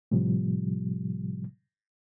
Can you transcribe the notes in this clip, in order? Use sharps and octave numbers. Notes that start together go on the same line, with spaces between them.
A2 C3 F3 G3